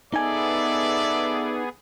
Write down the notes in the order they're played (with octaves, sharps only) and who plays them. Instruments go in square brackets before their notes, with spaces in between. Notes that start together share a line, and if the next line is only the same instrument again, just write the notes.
[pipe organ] B3 G#4 [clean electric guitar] D#4 G#5 [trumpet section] A4 D5 E5